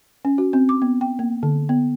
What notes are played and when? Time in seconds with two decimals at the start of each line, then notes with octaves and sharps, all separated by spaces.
0.25 C#4
0.38 F#4
0.53 C4
0.69 D6
0.82 B3
1.01 G5
1.19 A#3
1.43 D3
1.69 B3